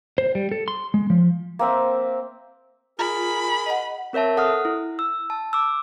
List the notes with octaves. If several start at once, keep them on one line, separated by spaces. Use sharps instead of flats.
C5
G3
A4
C6
G#3
F3
A#3 C4 E5
F4 G#4 A#4 B5
D#5 F#5
C4 A#4 C#5 E5 A5
A4 F#5 D#6 F6
E4
E6
A5
D6 E6